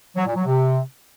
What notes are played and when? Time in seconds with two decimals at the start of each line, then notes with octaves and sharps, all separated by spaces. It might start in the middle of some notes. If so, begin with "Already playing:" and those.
0.16 F#3
0.26 A#2
0.35 F#3
0.45 C3